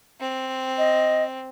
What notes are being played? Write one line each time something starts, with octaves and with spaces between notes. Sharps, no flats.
C4
D#5